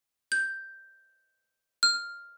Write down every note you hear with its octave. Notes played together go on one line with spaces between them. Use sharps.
G6
F6